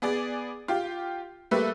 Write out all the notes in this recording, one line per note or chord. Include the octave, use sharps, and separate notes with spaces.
B3 G#4 D5
F4 G4
G3 A3 A#3 B4 E5